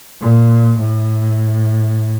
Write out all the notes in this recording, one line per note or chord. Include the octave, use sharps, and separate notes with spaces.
A#2
A2